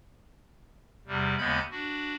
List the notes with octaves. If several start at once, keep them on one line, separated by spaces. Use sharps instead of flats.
E2 C3 G3
D#2 C#3 G#3 B3 B5 G6
D4 F#4